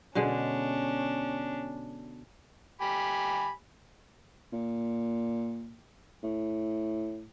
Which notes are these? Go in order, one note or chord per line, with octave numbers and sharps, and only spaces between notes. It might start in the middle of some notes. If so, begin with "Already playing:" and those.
B2 D3 G#3 C#4 D4
G4 G#5 B5
A#2
A2